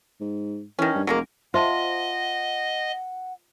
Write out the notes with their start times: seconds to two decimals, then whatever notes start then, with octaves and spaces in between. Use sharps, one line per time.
0.21 G#2
0.79 D#3 E3 C#4
0.95 G2
1.07 F1 F#3 G#3 A#3
1.54 F4 C5 D#5 E5 F#5 A5